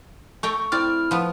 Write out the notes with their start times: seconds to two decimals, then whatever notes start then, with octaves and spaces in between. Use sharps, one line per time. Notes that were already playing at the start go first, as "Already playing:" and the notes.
0.43 A3 G5 A#5 C#6
0.72 C4 E4 D5 F6
1.11 F3 B3